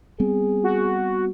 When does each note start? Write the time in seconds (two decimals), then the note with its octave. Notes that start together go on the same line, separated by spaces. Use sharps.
0.20 G3 B3 C4 G#4
0.64 F#4